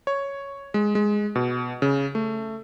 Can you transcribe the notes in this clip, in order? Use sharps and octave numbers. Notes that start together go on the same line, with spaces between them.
C#5
G#3
G#3
B2
C#3
A3